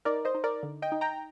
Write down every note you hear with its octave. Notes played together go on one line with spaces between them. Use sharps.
D#4 A#4 D5
C5 D#5
D#4
A#4 D5
D3
D#5 G5
D#4
G5 A#5